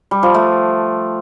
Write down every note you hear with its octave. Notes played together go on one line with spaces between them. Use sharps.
G3
F3
A3